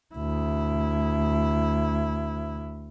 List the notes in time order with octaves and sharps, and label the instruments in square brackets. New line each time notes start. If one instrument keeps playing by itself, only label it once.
[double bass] D2 E4